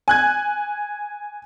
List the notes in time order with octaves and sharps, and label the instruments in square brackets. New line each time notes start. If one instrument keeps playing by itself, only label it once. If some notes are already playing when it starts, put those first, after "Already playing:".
[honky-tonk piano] G#5 F#6 G#6